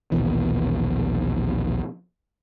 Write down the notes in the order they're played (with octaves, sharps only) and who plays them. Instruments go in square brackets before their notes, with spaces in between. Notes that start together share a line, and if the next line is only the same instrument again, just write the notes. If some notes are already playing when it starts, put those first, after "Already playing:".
[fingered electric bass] A#1 D#2 B2 E3